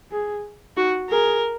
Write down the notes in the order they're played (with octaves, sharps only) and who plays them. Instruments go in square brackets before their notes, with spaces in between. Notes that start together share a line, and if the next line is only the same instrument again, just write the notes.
[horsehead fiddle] G#4
[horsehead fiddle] D#4 [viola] F#4
[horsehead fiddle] G#4 [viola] A#4